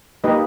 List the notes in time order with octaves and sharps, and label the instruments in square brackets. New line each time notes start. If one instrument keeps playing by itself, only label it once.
[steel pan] A#3 D#4 G4 B4 D#5